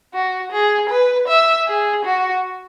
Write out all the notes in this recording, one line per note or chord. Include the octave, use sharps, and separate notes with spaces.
F#4
G#4
B4
E5
G#4
F#4